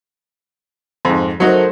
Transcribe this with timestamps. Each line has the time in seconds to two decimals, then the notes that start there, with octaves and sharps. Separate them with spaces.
1.05 F2 G#2
1.40 F#3 A3 D#4 F#4 A#4 C5